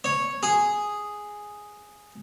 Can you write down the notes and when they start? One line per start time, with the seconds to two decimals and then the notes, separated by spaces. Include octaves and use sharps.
0.04 C#5
0.43 G#4